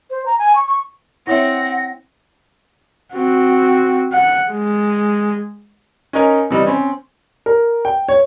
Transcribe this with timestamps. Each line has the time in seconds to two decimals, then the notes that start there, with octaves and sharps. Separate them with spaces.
0.10 C5
0.26 A#5
0.39 G#5
0.55 C#6
0.67 C#6
1.27 C4 E4 C#5 E5 F#5 A#6
3.14 C4 F#4
4.13 F#5
4.51 G#3
6.13 C#4 D#4 A#4 G#5
6.50 C3 E3 G3 D#4
6.67 C4 C#4
7.46 A#4
7.85 G5
8.09 C#5